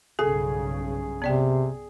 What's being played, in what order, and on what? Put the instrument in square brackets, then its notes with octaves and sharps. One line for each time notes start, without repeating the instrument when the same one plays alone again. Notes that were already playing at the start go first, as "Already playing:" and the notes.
[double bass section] B1 G2 C#3 [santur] G#4 [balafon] A4
[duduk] C3 [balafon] B3 D5 G5